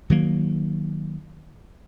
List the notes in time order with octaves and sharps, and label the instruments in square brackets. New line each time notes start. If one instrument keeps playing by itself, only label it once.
[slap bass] D#3 F#3 A#3